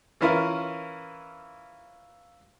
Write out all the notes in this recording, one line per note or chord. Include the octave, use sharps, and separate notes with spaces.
E3 C#4 E4 F4 A#4